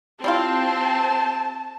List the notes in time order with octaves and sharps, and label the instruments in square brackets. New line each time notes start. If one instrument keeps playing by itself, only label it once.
[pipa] G3 E4 F4 [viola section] C4 [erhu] A5